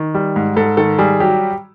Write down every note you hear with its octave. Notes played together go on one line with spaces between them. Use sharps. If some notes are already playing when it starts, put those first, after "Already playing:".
Already playing: D#3
G3
G#2
G#2 A4
D#3 A4
G3 G#4
F#3 G4